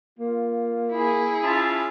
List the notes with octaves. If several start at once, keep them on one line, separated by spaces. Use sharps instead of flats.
A#3 F4
E4 G#4
C#4 F4 E5 A5